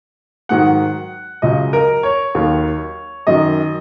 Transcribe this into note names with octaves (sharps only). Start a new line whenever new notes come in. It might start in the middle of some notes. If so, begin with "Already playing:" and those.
G#2 D#3 F#3 F#5
C#2 C#3 F#3 D#5
A#4
C#5
D#2 D#3 F#3
F#2 D#3 F#3 D#5